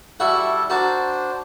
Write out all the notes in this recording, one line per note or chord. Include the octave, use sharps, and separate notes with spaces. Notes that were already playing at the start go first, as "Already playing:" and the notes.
G3 E4 F#4 A4 E5 F#5
D4 F#4 A#4 C5 A5